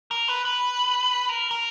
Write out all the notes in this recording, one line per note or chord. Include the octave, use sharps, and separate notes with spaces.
A#4
B4
B4
A#4
A#4